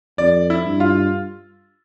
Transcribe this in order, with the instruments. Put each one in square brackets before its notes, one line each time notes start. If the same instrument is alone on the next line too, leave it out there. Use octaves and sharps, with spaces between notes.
[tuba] F2 [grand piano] D5
[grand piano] E4
[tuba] G2
[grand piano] F4